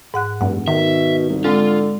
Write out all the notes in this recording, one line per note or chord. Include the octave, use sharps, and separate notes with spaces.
G#2 F#5 F#6
F1 G2 F#5
B2 D#3 E5
C2
D3 G#3 C4 F4